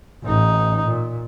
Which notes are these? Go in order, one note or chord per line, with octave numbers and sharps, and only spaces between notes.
A1 D#4
A#2